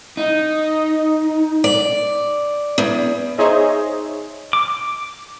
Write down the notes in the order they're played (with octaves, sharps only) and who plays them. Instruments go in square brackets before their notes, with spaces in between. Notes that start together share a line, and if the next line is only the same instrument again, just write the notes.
[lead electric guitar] D#4
[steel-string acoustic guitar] D5
E2
[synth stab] D#4 G#4 C5 C#5 D#5 E5
[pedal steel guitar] D6